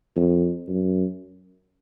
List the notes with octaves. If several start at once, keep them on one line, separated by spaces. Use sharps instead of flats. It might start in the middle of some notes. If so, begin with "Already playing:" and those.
F2
F#2